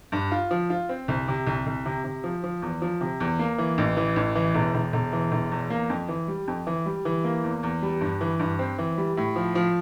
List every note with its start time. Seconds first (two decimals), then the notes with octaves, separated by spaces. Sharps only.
0.12 G2
0.31 F4
0.51 F3
0.70 F4
0.89 C4
1.08 C2
1.28 C3
1.47 C2
1.66 C2
1.86 C3
2.04 C3
2.24 F3
2.44 F3
2.62 E2
2.82 F3
3.01 C3
3.20 E2
3.39 A#3
3.58 E3
3.78 A1
3.97 E3
4.16 A1
4.35 E3
4.55 E1
4.74 E1
4.93 E1
5.13 E3
5.32 E1
5.51 E2
5.70 A#3
5.90 F2
6.08 E3
6.28 G3
6.47 F2
6.67 E3
6.86 G3
7.05 E3
7.24 A#3
7.44 E2
7.63 E2
7.82 G3
8.01 G2
8.21 E3
8.40 G2
8.59 C4
8.78 E3
8.98 G3
9.17 A2
9.36 F3
9.55 F3